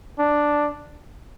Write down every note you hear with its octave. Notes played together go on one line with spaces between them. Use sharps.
D4